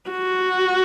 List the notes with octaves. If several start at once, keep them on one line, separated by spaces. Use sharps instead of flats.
F#4